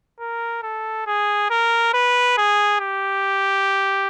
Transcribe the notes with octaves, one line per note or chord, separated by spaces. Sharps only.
A#4
A4
G#4
A#4
B4
G#4
G4